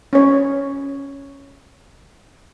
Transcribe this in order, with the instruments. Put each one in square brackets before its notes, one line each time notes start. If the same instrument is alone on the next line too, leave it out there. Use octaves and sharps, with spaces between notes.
[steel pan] C#4 C#5